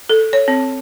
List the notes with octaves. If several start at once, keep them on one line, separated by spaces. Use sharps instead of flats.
A4
C#5
C4